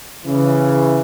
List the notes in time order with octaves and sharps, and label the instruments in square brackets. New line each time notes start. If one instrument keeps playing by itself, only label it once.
[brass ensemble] C#3 E3